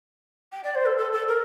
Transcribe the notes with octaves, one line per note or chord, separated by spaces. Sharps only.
G5
D5
C5
A4
A4
A4
A#4